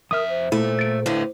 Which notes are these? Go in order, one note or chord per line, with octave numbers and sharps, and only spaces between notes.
F2 A#4 E5 D#6 F6
C5
A#2 A3 E4
A6 D7
A2 D3 B4 D#5 F5